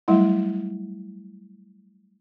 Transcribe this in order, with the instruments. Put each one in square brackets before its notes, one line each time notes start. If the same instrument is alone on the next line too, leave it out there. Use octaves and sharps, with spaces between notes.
[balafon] F#3 G3 A3 E4 F#5